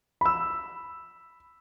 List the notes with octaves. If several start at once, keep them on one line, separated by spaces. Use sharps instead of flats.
B5 E6